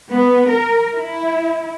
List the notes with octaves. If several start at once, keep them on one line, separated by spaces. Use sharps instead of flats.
B3
A#4
E4